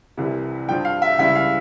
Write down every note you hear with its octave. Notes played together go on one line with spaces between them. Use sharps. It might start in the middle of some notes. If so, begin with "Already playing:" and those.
C2 C3 E3
G2 F3 G5
F5
E5
C#2 C#3 E3 G3 E5
F5